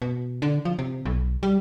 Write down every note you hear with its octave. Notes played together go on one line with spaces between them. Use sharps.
B2
D3
F3
C3
B1
G3